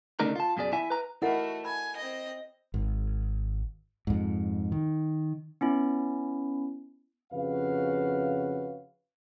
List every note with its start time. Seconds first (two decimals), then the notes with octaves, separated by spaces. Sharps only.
0.20 D2 C#3 A3 D4 D#4 A#4
0.36 F4 A5
0.57 F#2 B2 G#4 D5
0.73 E4 E5 G#5
0.90 B4 A#5
1.22 A3 E4 F#4 A4 A#4 D#5 F#5
1.65 G#5 B5
1.97 C4 D#5
2.74 G#1
4.07 F2 G#2
4.72 D#3
5.61 B3 C#4 E4
7.33 F2 C#3 C#4 F#4 B4 F5